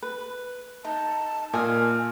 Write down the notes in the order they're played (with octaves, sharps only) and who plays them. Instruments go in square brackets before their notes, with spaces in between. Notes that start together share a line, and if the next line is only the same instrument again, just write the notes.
[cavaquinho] B4
[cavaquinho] D#4 [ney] A5
[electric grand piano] A#2 [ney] A#4 [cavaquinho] D#5 G#5